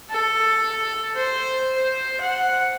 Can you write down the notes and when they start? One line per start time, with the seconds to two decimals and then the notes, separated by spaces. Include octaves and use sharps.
0.11 A4
1.15 C5
1.77 C5
2.21 F#5